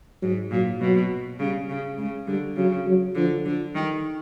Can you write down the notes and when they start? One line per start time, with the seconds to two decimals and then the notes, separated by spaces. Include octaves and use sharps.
0.22 G#2 F#3
0.51 A#2 F#3
0.80 B2 F#3
1.39 C#3 G3
1.69 C#3
1.98 C#3 G#3
2.27 D3 G3
2.56 C#3 F#3
2.87 F#3
3.15 D3 F3
3.45 D3 F3
3.74 D#3 G3